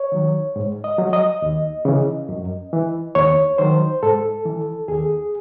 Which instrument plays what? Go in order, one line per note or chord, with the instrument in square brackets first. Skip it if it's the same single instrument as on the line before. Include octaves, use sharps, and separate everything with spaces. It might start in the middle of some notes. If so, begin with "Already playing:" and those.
Already playing: [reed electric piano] C#5
D#3 F#3
G#2
D#5
F#3
D#5
D#2
C#3 E3
F#2
E3
D#2 C#5
D#3 F#3 C5
G#2 A4
E3
D#2 G#4